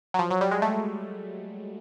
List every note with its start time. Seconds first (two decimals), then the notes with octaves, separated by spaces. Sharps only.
0.14 F#3
0.19 F3
0.31 F#3
0.41 G3
0.51 G#3
0.62 A3